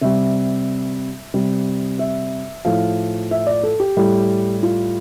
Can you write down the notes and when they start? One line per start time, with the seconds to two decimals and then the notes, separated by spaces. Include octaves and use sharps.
0.01 C3 G3 E5
1.34 C3 G3
1.99 E5
2.65 A2 F3 F5
3.31 E5
3.47 D5
3.63 A4
3.80 G4
3.97 A2 G3
4.63 F4